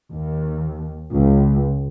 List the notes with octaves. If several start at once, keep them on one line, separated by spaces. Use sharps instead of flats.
D#2
C#2